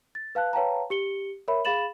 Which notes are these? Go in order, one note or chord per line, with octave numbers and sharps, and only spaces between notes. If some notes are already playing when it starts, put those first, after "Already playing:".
A6
B4 F5 A5 F#6
B4 C#5 F5 G5 A5 A#5
G4 C#7 G7
A#4 C#5 E5 B5
G#4 F5 B5 A6 E7 F#7